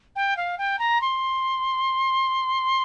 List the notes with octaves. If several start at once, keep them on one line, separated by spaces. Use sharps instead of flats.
G5
F5
G5
A#5
C6